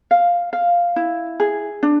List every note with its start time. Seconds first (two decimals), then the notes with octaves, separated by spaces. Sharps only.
0.11 F5
0.53 F5
0.96 E4
1.40 G#4
1.83 D4